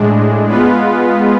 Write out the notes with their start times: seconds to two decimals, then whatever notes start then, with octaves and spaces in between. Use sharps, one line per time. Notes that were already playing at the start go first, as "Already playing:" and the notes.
Already playing: A2 G#3 D4
0.49 G#3 B3 F4 B4